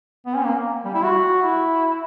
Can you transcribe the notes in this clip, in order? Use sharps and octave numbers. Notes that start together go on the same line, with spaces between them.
B3
C#4
A#3
G3
E4
F#4
E4